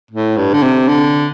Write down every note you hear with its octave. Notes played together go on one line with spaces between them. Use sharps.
A2
G2
D3
C3
D3